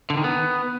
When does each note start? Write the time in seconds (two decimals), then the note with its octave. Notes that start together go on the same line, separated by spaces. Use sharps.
0.10 D3
0.17 D#3
0.24 B3